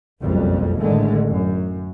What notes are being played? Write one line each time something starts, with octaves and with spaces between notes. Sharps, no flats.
F#1 B1 F2 G3
A1 A2 D3 D#3 G#3 A3
F#2